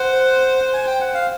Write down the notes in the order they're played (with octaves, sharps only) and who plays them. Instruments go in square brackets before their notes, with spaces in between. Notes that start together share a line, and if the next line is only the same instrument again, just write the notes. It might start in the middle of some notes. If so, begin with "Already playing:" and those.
Already playing: [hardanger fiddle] C5 [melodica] F#5
[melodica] G#5
G5
F#5
F5